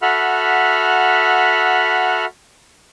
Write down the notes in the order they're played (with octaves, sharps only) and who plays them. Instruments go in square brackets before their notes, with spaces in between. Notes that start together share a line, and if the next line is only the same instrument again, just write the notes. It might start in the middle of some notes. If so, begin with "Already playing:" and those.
[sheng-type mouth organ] F#4 A4 E5 F#5 B5 F6